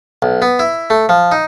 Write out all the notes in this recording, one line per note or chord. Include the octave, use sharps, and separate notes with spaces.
B1
B3
E4
A3
F3
D#4